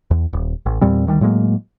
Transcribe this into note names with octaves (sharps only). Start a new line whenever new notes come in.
E2
D#1
A1
E2 A#2 G3 C4
D2 D#3 G3
A2 F#3 G#3 A#3